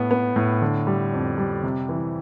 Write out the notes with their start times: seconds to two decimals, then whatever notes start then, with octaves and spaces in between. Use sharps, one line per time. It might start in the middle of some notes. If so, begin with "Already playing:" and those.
Already playing: A2 B3
0.11 B3
0.36 A2
0.62 D3
0.87 G3
1.13 F2
1.38 G3
1.63 C3
1.89 E3